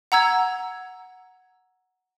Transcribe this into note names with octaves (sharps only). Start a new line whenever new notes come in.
F#5 A#5 E6 G#6